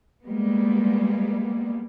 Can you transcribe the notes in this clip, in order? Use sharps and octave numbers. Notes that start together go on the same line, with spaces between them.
G3 G#3 A#3 B3